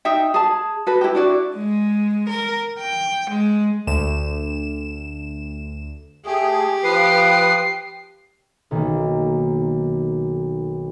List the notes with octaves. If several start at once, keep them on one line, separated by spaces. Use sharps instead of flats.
D#4 E5 G5
G#4 A5
F#4 A4 B4
E4 G4
D4 E4 F#4 D5
G#3
A#4
G5
G#3
D2 E7
A3 G4 G#4
F3 B4 D#6 C7
B1 D#3 A#3